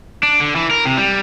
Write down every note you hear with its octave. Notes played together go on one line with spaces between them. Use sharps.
D4
D3
E3
A#4
C3
G3